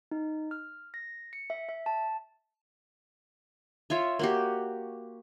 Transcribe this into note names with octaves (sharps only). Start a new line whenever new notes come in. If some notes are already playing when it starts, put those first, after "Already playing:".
D#4
F6
A#6
C#7
E5
E5
A5
F4 C#5 E5
A#3 F#4 G4